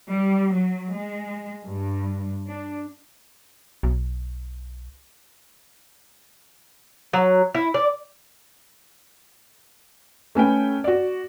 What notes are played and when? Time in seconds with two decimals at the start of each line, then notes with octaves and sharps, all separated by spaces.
0.11 G3
0.54 F#3
0.94 G#3
1.66 G2
2.47 D4
3.83 B1
7.13 F#3
7.55 E4
7.74 D5
10.35 A3 C#4 B4 G5
10.84 F#4 D5